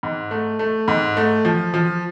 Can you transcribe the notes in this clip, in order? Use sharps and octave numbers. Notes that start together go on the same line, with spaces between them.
G#2
A3
A3
G#2
A3
F3
F3